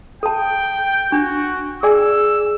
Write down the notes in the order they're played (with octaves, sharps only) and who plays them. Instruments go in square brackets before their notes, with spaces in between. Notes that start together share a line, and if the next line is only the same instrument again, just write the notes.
[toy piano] A4 A5 [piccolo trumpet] G5
[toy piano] D4 [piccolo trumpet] F#4
[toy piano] G#4 D5 G#5 [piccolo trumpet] E6